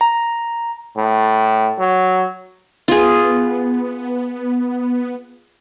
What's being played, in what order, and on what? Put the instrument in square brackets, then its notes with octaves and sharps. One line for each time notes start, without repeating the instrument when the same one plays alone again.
[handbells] A#5
[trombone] A2
F#3
[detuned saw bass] B3 [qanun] F4 G#4